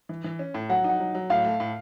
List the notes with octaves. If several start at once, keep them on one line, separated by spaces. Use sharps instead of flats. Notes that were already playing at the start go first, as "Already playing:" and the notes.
E3
E3
C#4
A2
F#3 F#5
D#4 F#5
F#3
F#3
A2 F5
A3
A2